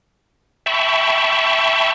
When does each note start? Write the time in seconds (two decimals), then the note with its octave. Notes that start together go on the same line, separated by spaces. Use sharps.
0.66 E5 G5 A5 B5 C#6